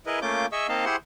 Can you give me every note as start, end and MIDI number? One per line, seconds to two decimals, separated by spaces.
0.06 0.19 64
0.06 0.19 68
0.06 0.19 70
0.06 0.19 71
0.06 0.19 75
0.22 0.46 57
0.22 0.46 58
0.22 0.46 61
0.22 0.46 65
0.22 0.46 86
0.22 0.46 91
0.52 0.67 68
0.52 0.67 75
0.52 0.67 76
0.52 0.67 85
0.52 0.67 88
0.68 0.85 58
0.68 0.85 60
0.68 0.85 63
0.68 0.85 75
0.68 0.85 77
0.68 0.85 81
0.85 0.96 64
0.85 0.96 67
0.85 0.96 68
0.85 0.96 72
0.85 0.96 78
0.85 0.96 84